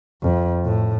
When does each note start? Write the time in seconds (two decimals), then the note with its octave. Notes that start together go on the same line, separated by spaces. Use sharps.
0.23 F2
0.64 A2